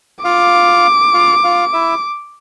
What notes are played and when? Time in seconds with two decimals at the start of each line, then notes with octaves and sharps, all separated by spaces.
0.24 F4 F5 D6
1.14 F4 F5
1.44 F4 F5
1.73 E4 E5